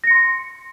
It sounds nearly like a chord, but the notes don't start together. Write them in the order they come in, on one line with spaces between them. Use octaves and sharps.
A#6 C#7 C6